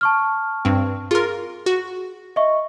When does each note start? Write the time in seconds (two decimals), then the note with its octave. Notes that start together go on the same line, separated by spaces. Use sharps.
0.01 A5 C#6 F6
0.65 G2 C4
1.11 F4 G#4 A#4
1.66 F#4
2.36 D#5 E5 C#6